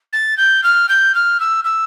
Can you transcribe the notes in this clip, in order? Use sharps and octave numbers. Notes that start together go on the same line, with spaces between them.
A6
G6
F6
G6
F6
E6
E6